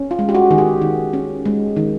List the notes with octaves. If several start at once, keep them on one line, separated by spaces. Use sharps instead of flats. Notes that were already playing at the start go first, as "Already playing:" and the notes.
Already playing: C#4
F4
G#3
G4
F#4
D#3 G#4
G4
D#3
C#4
G#3
D#3